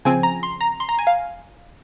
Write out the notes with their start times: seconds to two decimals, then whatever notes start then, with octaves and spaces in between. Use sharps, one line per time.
0.05 C#3 F3 C4 G#5
0.23 A#5
0.43 C6
0.61 A#5
0.80 C6
0.89 A#5
0.99 G#5
1.07 F5